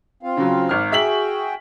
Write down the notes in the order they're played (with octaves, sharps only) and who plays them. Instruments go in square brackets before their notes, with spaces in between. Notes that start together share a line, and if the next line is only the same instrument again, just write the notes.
[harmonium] C4 F4 F5
[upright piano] C#3 F#3
G#1 F6
[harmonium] F#4 G#4 G5 [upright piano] E5 B6 F#7